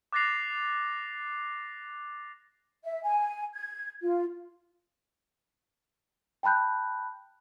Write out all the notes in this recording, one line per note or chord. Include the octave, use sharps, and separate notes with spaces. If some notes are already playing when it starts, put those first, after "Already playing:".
D6 F#6 A6 A#6 C7 F7
E5
G#5
G#6
F4
G5 A5 B5 F#6 G6